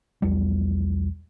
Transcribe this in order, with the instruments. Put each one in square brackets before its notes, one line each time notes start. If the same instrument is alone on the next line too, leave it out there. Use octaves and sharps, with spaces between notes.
[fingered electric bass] B1 E2 G3